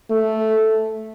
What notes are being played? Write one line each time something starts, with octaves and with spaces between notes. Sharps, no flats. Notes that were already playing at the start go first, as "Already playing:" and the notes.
A3